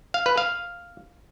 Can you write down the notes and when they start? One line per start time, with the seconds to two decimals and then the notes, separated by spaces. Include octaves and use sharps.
0.14 F5
0.26 B4
0.37 F5